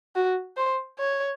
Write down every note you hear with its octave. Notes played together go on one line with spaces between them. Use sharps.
F#4
C5
C#5